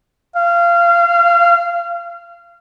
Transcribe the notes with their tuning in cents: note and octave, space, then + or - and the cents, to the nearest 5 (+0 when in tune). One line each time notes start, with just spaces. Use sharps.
F5 -25